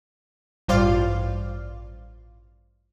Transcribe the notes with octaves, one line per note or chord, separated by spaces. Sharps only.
A1 G2 F4 C5 D5 F5